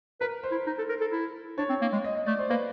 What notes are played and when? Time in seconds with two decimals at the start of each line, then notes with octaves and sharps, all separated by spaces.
0.21 A#4 B4
0.43 C5
0.51 E4
0.67 D#4
0.78 A4
0.89 A#4
1.01 A4
1.12 E4
1.58 D4 C#5
1.69 C4
1.81 A#3
1.93 G#3
2.04 D#5
2.15 D#5
2.26 A3 D5
2.39 C5
2.50 A#3 B4